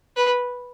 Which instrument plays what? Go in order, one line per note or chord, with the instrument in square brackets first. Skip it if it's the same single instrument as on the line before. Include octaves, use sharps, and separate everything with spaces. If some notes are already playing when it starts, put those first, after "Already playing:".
[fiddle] B4